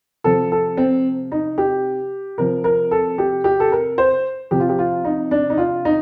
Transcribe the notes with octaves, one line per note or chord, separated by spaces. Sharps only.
C3 F3 A4
A4
C4
D#4
G4
C3 F3 A#4
A#4
A4
G4
G4
A4
A#4
C5
C3 F3 G4
F4
G4
F4
D#4
D4
D#4
F4
D#4